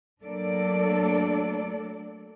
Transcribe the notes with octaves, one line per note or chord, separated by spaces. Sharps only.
F#3 A3 A#3 D4 A4 D5